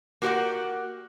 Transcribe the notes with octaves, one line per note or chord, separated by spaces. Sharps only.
A#3 F#4 G4 C5 D5 F#5